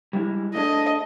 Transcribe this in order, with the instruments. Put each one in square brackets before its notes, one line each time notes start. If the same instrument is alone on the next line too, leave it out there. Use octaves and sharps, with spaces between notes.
[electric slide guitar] G3 G#3 E4
[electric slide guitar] A3 D4 G#4 [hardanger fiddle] D#5